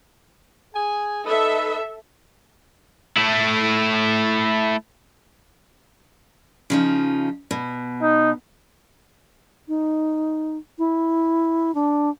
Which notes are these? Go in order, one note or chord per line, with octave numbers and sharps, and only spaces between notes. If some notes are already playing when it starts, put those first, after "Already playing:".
G#4 G#5
D#4 A4 B4 D#5 E5
A3 E4
C#3 F3 D#4
B2
D#4
D#4
E4
D4